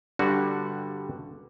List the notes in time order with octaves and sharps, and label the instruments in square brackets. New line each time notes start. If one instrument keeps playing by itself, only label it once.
[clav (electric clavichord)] G2 D3 G3 F#4